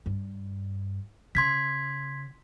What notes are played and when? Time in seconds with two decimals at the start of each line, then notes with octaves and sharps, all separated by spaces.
0.06 G2
1.35 C#3 C6 G#6 B6